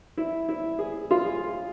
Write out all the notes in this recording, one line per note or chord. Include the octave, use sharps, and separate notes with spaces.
E4
E4
G#4
F4
G#4